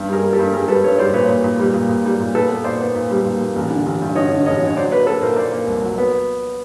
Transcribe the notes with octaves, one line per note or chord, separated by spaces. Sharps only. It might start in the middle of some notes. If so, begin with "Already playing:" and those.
Already playing: G2
G3 G#4 A#4
G3
G4 A4
G2
G2 G#4 A#4
G3 A4 B4
G2 B4 C#5
G3 C5 D5
A#2 B4 C#5
A#2
A#2
G3
A#2
A#2
G3
A#2
A#2 A4 B4
B3
A#2 C5 D5
B3
A#2
G3
A#2
A#2
A1
D3
A1
G2
D3 C#5 D#5
D3
A1 C#5 D#5
D3
C#5
F#3 C5 D5
A#3 B4 C#5
A#3 A4 B4
A#2 A#4 C5
A#3 C5 D5
A#3
C2
F#3
B3